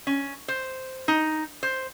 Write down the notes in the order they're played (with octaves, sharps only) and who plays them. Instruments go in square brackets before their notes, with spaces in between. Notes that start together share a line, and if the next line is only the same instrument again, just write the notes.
[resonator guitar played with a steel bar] C#4
C5
D#4
C5